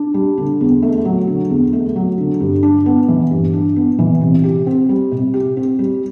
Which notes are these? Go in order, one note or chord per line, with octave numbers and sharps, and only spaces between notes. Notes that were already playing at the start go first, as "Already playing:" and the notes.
Already playing: D4
G3
D3
E2
A3
F#3
D3
E2
A3
F#3
D3
G2
D4
B3
E3
G2
D4
B3
E3
C3
G4
C4
G3
C3
G4
C4
G3